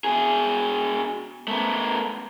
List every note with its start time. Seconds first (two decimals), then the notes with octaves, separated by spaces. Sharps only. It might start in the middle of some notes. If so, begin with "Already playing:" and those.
0.04 B2 G#4
1.48 A3 B3